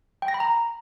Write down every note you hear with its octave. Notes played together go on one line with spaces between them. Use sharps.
G5
A#6
B5
A#5